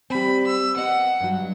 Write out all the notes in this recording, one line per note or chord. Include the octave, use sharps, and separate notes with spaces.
G3 C4 B5
E6
B3 D#5 F#5
G2 F#3